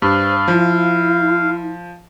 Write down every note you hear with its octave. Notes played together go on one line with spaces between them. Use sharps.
G2 C5 F5
F3 E4